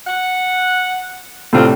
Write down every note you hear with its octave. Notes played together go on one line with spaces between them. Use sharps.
F#5
A2 C3 A3 C4 D4 F4